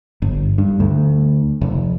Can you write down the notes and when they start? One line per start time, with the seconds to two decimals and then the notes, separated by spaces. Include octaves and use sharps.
0.22 G1
0.58 G2
0.80 D2
1.61 F1